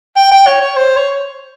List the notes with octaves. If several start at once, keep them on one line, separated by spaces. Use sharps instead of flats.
G5
G5
C#5
C#5
C5
C#5